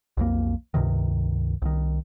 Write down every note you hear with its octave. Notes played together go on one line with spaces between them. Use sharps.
B1 F2 A#3
C#2 G2 C3 D#3
C2 D#3